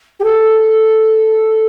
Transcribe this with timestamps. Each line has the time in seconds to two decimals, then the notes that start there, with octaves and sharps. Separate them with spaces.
0.19 G4
0.24 A4